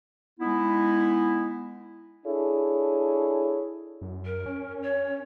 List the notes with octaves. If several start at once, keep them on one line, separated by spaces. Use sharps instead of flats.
G#3 B3 D#4 E4
D4 E4 G#4 A4 C#5
F#2
A#4
C#4
C#5